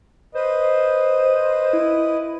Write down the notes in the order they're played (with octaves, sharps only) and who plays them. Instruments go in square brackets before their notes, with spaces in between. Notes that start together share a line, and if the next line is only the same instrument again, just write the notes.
[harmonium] B4 D#5 [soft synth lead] C5
[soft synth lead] E4